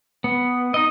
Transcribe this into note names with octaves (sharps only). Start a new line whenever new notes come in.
B3
D#4 D#5